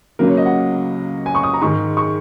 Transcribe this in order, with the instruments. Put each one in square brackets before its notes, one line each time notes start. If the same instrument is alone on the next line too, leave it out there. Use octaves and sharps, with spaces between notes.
[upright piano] C#2 C#3 F#3 A#3 A#4
C#5
D#5
F#5
G#5
C#6
D#6
A#5
G#2 D#3 G#3 C#6
C#6